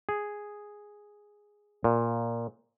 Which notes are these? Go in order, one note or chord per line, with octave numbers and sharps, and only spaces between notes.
G#4
A#2